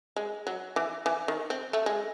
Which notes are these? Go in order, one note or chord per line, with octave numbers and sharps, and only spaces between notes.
G#3
F#3
E3
E3
D#3
C4
A3
G#3